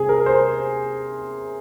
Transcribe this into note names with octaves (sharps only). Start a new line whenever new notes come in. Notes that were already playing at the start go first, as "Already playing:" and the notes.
Already playing: C3 G#4
A#4
C5